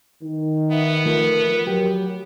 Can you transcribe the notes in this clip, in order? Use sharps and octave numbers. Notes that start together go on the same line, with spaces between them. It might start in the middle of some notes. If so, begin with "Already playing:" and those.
D#3
B3 E5
F3 A3 A#4
F#3 G4